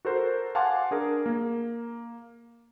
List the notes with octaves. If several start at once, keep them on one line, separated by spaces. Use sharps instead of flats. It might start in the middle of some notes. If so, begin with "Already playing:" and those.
F#4 A4 A#4 C5
F5 F#5 G#5 A5 C6 D6
D4 G#4 A#4
A#3